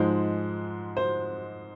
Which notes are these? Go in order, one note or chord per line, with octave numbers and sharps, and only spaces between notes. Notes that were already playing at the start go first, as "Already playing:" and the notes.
Already playing: G#2 F3 G#3 C5
C5